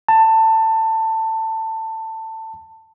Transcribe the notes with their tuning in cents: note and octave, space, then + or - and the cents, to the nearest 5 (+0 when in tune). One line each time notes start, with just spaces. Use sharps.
A5 +20